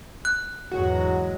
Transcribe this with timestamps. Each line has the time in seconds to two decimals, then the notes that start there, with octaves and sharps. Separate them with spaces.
0.25 F#6
0.72 E2 G#2 D3 F#3 G#3 F#4